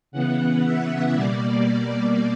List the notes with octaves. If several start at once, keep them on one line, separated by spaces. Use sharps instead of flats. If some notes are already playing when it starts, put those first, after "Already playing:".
C#3 E3 B3 F#5
E5
B2 G3 A#3 D5